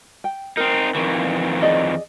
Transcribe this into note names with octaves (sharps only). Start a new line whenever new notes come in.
G5
C4 D#4 A#4
F2 D#3 E3
G#4 D5 D#5